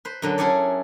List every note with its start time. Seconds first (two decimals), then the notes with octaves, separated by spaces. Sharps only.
0.05 B4 C5
0.22 F#2 D3 F#3
0.38 C#4 E4 G#4 A4 C#5 D5